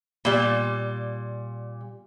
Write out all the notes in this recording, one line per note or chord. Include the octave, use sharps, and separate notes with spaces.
A#2 G3